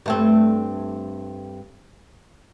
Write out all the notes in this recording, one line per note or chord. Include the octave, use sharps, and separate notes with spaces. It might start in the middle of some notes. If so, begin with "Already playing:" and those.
G2 A3 C4